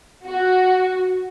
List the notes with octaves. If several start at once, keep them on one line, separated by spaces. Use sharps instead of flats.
F#4